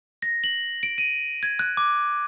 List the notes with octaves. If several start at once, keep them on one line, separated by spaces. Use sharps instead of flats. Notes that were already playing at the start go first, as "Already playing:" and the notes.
A#6
F#7
D7
D#7
G#6
F#6
D6